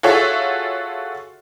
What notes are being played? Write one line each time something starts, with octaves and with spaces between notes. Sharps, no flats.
F4 F#4 G#4 A4 C#5 E5